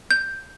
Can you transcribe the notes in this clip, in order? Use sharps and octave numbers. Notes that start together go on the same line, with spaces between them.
G6